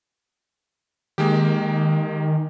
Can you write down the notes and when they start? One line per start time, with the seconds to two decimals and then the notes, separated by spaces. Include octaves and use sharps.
1.18 D#3 G#3 A#3 G4